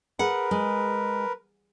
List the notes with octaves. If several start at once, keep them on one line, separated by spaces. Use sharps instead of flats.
G#4 A#4 B4 F#5
G#3